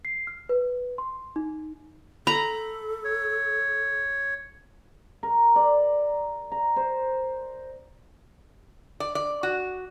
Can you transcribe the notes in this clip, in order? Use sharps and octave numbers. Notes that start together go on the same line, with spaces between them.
C7
F6
B4
C6
D#4
A4 A#5 B5
C#5
A#4
D5
A#5
C5
D5
D5
F#4